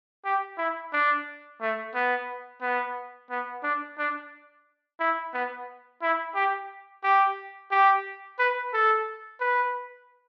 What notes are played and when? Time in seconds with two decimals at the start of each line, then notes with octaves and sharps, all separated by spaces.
0.25 G4
0.58 E4
0.93 D4
1.61 A3
1.94 B3
2.61 B3
3.30 B3
3.63 D4
3.98 D4
5.00 E4
5.33 B3
6.02 E4
6.35 G4
7.04 G4
7.71 G4
8.39 B4
8.73 A4
9.40 B4